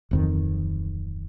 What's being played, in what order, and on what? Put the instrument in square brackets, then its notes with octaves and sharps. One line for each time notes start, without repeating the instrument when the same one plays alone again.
[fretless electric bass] D1 F2 D#3